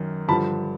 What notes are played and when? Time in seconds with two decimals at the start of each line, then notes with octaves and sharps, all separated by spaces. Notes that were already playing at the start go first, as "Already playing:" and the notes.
Already playing: F#2 D#3
0.28 G2 D3 F3 A5 B5